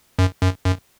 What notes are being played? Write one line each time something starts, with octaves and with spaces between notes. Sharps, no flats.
F#2
F#2
F#2